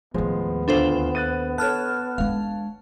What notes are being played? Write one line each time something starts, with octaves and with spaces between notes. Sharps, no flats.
D#2 A2 F3 G#3 B3
D2 D4 F4 A4 C5 C6
F#6 A6 D#7
A4 C#5 A5 F6 F#6
G#3 D4 F5